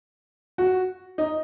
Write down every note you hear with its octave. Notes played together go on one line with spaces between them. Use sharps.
F#4
D#4